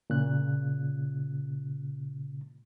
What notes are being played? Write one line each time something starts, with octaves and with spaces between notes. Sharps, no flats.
A#2 C#3 F#6